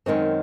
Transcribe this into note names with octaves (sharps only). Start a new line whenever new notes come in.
F#2 D#3 G#3 C4 C#5